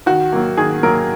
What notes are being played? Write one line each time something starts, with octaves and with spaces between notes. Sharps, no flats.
D#3 F#4
F#3 A#3
D#3 G#4
F#3 A#3 A#4